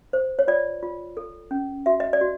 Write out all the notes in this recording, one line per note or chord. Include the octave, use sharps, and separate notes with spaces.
C5
C#5
F4 D5
F4
A4
C#4
F#4 E5
D#5
D5
F#4